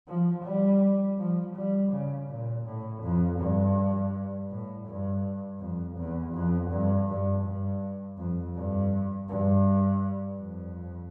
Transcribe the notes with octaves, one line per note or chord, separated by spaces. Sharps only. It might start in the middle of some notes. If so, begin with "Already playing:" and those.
F3
G3
F3
G3
C#3
A#2
A2
F2
G2
A2
G2
F2
E2
F2
G2
G2
G2
F2
G2
G2
F2